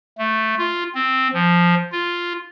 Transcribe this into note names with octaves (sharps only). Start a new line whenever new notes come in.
A3
F4
C4
F3
F4